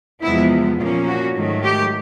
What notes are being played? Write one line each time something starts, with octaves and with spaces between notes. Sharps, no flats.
E2 C3 F3 G#3 B3 E4
A#2 F3 A#3 C#4 F4
F#4
G#2 D#3 F#3 A3
G4